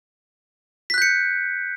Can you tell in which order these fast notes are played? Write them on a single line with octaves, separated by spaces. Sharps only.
B6 F#6 G6 C#7